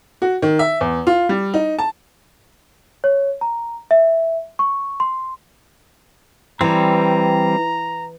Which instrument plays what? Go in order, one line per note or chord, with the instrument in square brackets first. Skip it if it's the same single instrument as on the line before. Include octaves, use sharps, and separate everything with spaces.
[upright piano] F#4
D#3
E5
E2
F4
G3
D#4
A5
[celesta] C#5
A#5
E5
C#6
C6
[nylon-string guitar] E3 [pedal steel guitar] G3 C4 [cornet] A#5